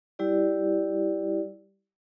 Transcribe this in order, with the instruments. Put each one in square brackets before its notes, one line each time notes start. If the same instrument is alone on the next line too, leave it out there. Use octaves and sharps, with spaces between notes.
[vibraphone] G3 E4 G4 D5